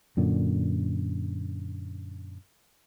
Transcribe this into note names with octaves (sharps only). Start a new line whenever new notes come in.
F#2 A#2 D3